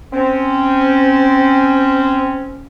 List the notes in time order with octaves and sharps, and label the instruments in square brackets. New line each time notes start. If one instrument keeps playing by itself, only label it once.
[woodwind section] C4 C#4